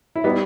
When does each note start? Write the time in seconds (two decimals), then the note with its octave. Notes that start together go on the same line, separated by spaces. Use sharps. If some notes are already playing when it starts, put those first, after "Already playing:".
0.16 E4
0.24 G3 B3 D#4